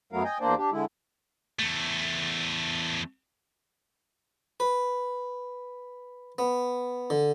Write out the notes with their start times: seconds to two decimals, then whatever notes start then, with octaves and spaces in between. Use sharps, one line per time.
0.13 F#2 F#3 A3 B3 A#4 F5
0.25 D#5 G5 G#5
0.40 E2 A#3 D4 C5 D5
0.57 D4 G4
0.71 D3 G#3 E4
1.59 E2 A3
4.60 B4
6.38 B3
7.10 D3